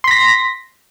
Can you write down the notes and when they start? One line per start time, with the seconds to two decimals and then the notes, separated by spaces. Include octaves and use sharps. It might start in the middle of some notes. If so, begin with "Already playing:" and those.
0.04 C6
0.08 B6
0.11 A#6